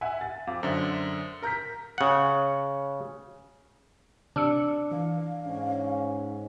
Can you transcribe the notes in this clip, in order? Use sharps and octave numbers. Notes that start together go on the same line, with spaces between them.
E5 F#5 G#5
A6
F2 F4 D6
F#2 D3 C5 E5
A#4 A#5 F6 G6 B6
C#3 F#5
C3 D4 E6 C#7
E3 F5
G#2 C#4